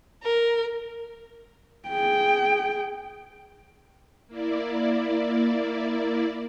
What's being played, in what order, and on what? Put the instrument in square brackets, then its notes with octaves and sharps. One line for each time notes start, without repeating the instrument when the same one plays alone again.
[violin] A#4
[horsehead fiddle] G#4 G5
[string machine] A#3 E4 D5